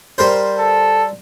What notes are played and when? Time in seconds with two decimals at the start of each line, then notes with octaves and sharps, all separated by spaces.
0.18 G3 A#4 C5
0.59 A4